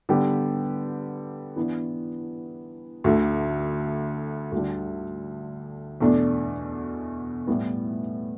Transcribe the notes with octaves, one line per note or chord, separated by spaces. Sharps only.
D3 G3 B3 G4
E3 B3 D4
D2 D3 A3
D2 D3 G3
E2 B2 A3 D4
A2 G3 B3